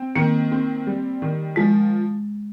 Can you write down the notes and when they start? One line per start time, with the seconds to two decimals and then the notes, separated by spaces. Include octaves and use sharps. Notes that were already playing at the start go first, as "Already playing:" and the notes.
Already playing: C4
0.16 D#3 A#3
0.52 C4
0.87 G3
1.22 D#3
1.56 F3 G#3